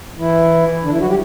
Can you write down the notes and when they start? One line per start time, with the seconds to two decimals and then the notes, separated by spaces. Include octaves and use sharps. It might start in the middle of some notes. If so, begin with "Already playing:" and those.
0.18 E3 E4
0.84 D3 D4
0.92 E3 E4
1.00 F#3 F#4
1.09 G3 G4